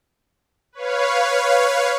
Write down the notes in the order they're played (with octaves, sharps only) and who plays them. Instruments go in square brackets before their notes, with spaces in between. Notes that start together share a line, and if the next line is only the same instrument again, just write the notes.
[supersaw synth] B4 C#5 F5